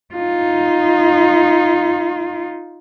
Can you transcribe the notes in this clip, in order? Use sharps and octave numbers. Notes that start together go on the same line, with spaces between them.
D#4 F4